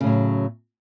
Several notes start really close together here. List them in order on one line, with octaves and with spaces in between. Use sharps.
C#3 A2 F#3